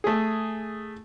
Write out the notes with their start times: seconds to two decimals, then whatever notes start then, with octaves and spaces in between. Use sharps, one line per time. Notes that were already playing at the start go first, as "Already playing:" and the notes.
0.04 A3 G#4